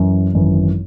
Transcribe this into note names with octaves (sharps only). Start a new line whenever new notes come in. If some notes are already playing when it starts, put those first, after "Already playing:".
Already playing: F#2 E3
G#1 F#2 E3